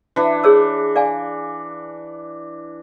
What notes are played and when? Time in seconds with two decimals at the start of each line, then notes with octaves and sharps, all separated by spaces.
0.16 E3 D4
0.44 G#4 C#5 E6
0.96 D5 F5 G#5